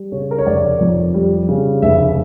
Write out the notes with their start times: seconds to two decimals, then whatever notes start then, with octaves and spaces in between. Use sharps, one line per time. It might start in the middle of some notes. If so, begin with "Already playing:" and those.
Already playing: G3
0.12 C#3 C#5
0.31 A#4
0.38 C#5
0.46 F1 D5
0.80 F2
1.14 G3
1.49 C#3
1.82 F1 E5